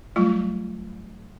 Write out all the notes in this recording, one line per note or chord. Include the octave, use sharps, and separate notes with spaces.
F#3 G3 A3 F4